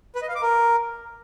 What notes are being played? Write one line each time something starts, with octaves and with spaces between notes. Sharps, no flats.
B4
D#5
F5
D6
A#4